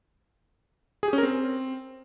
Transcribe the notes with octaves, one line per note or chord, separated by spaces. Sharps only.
G#4
G4
C#4
A#4
C4